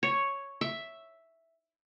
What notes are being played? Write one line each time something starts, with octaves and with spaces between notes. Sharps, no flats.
C#5
E5